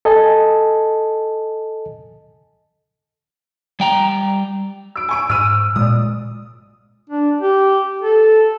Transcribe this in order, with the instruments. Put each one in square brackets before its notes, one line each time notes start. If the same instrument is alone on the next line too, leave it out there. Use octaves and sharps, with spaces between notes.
[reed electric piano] A4 D#5 G#5 A5
[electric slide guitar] G3 G5 A#5
[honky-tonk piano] E6 D7
G#5 C#6 D7
[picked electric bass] G#2 [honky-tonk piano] E6 F6 D#7
[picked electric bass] A#2 G#3 [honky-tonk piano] D5 D#6
[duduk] D4
G4
A4